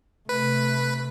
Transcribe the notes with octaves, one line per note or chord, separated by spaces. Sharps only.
C3 A3 B4